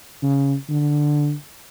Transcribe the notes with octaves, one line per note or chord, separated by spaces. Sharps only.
C#3
D3